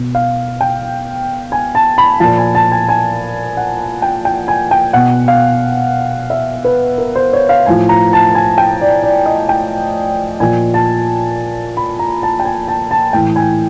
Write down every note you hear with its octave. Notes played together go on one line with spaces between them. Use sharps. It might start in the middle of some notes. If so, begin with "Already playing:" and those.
Already playing: B2
F5
G5
G#5
A5
B5
A#2 F3 A5
G#5
A5
G#5
G#5
F#5
G5
G5
G#5
G5
B2 F#5
F5
E5
B4
A#4
C5
C#5
F5
A2 F3 G#5
A#5
A5
G#5
G5
D5
D5
D#5
G5
A#2 F3 G#5
A5
B5
A#5
A5
G5
G#5
A5
A5
A2 E3 G5
G#5